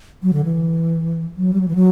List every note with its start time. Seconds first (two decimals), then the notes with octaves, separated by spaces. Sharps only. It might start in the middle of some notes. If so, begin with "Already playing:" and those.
0.23 F#3
0.33 D3
0.44 E3
1.36 F#3
1.53 G3
1.61 F#3
1.68 E3
1.75 F#3